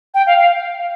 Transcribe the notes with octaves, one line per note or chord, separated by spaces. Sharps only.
G5
F5
F5